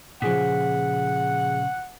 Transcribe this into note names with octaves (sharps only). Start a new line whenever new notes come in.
A#2 C#3 F3 G#4 F#5 B6